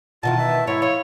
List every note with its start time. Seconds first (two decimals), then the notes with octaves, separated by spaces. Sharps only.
0.23 B2 D#3 E3 F4 A5
0.37 E5
0.67 G#2 C4 E4 C#5
0.82 F3 F4 C#5